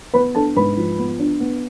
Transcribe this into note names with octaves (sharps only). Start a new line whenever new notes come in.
B3 B4 B5
D4 A4 A5
G#2 B4 B5
F3
B3
D4
B3